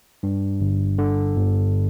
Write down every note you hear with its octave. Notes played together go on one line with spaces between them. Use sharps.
G2
G1
D3
G1